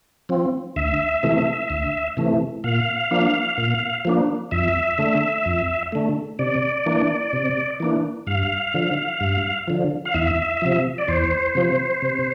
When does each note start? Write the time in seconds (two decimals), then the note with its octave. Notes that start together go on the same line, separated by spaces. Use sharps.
0.29 F3 C4
0.76 D2 E5
1.23 C3 E3 A3
1.70 D2
2.17 C3 E3 A3
2.64 A#2 F5
3.11 F3 A#3 D4
3.58 A#2
4.05 F3 A#3 D4
4.51 F2 E5
4.98 D3 A3
5.46 F2
5.92 D3 A3
6.39 C3 D5
6.86 E3 A#3 D4
7.33 C3
7.80 E3 A#3 D4
8.27 G2 F5
8.74 D3 F3
9.21 G2
9.68 D3 F3
10.05 F5
10.14 E2 E5
10.62 C3 F3
10.98 D5
11.08 E2 C5
11.55 C3 F3
12.02 C3